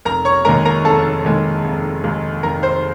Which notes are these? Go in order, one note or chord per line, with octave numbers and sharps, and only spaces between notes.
F1 A#4 A#5
C#5 C#6
D#2 D#3 G#3 A#4 A#5
A#4 A#5
F1 A4 A5
D#2 D#3 G#3
F1
D#2 D#3 G#3
F1 A#4 A#5
C5 C6